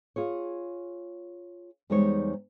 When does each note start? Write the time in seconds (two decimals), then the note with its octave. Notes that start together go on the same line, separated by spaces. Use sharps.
0.16 F4 G#4 C#5
1.90 E2 G3 G#3 D#4 C5 C#5